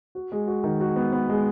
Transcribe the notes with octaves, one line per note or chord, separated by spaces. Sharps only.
F#4
G#3
F#4
D#3
F#4
B3
B3
G#3